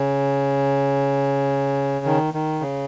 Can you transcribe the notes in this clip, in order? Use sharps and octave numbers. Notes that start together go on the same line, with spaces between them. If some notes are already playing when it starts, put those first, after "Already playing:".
Already playing: C#3
D#3
D#3
C#3